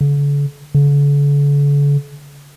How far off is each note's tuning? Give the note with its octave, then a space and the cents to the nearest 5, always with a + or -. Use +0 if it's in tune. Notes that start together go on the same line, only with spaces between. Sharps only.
D3 -45
D3 -45